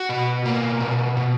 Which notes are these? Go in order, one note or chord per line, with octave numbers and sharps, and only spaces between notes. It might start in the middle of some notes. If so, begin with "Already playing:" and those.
Already playing: F#4
B2
A#3
B2
B2